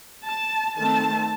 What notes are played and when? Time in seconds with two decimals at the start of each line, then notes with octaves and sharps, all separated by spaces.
0.25 A5
0.77 D#3 A3 C4 A5